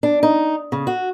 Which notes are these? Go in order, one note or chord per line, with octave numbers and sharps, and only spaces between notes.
D4
D#4
C#3
F#4